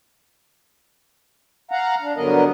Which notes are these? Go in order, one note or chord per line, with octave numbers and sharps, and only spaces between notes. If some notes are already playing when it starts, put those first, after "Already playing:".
F5 F#5 A#5
D4
G2 D3 F#3 B3 A#4 D#5